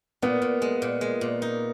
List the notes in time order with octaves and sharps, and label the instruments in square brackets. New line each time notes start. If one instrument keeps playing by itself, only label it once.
[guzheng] A#2 [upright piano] B3
[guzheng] A#2
G#3
A#2
G#3
A#2
D#4